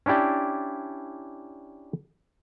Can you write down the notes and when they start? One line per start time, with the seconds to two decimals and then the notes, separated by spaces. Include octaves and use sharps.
0.06 C#4 D4 E4 G4 D5